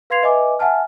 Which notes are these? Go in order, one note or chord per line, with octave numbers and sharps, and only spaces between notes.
B4 F5 C6 G#6 C7 F7
B4 D#5 E5 G#5 D6
E5 F#5 G#5 A5 F6